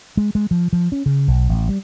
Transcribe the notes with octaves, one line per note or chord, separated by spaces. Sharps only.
G#3
G#3
F3
F3
C#4
C#3
B1
A1
G3